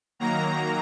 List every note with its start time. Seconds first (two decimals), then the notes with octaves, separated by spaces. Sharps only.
0.19 D#3 F#3 A#3 A#5